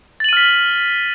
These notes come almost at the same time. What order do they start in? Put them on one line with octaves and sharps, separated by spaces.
A6 F#7 D#7 F6 B6